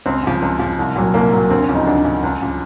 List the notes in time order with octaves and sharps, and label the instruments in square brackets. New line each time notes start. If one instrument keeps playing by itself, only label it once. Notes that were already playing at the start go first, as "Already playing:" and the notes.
[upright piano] C#2 C4
C#3 F3
C#2
C#3 F3
C2
A#2 F#3
C2 A#3
A#2 F#3
D2 C4
C#4
C#3 F3
D#4
D2 D4
C#3 F3
C#2
C#3 F3